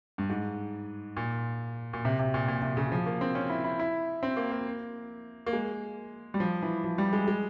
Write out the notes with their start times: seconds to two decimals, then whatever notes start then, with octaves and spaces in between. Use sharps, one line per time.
0.18 G2
0.29 G#2
1.17 A#2
1.93 A#2
2.05 C3
2.19 C3
2.34 A#2
2.48 A#2
2.62 C3
2.77 C#3
2.92 F3
3.06 A#3
3.21 C4
3.35 C#4
3.50 E4
3.64 E4
3.79 E4
4.23 C4
4.37 A#3
4.52 A#3
5.46 A#3
5.53 G#3
6.34 G3
6.40 F3
6.62 E3
6.84 F3
6.98 G3
7.13 G#3
7.28 G#3